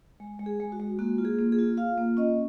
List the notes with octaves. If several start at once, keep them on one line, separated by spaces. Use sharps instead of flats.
G#3
G#3
G#4
G#3
F#4
G#3
A#3 F#4
F4
G#4
A#3
G#4
F4
F4 F5
A#3
C#4 D#5